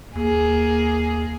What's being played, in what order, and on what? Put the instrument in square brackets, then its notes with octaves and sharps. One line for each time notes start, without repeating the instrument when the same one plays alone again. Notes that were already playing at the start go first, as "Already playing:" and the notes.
[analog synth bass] D#2 [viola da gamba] A#3 G#4